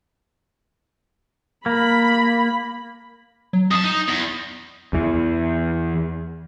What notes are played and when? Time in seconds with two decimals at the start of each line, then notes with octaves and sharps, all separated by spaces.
1.66 A#3 B5
3.53 F#3
3.71 F2 A5 D#6
3.84 D#4
4.08 E2
4.93 E2 E3